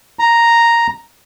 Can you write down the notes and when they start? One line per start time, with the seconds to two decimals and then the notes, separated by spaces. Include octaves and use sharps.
0.19 A#5